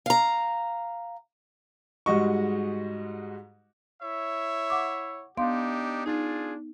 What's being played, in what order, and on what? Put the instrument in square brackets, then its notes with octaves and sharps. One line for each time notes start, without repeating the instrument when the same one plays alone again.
[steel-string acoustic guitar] F5 A#5
[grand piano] G#2 G3 G#3 F#4 D#5 C#6
[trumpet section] E4 C#5 E5
[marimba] F#5 D6
[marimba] B3 F5 C6 [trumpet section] D4 D#4 G4
[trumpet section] D4 F4 G#4 [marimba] D#4